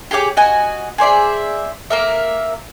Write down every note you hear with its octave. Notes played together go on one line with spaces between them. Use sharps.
G4 G#4 C#5 D6
F#4 D#5 G#5
G#4 C5 D5 E5
A#3 A#4 E5